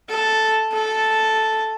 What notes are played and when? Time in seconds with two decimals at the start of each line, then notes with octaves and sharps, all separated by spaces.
0.10 A4
0.73 A4